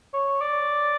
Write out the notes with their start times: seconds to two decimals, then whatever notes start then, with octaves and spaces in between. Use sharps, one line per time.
0.14 C#5
0.41 D5